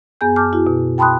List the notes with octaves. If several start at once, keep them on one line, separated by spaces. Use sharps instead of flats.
F#2 B3 G#4 G#5 G6
A5 D6 F6 G6
E4 F#4
B2
G5 A5 B5 C6 D#6 F#6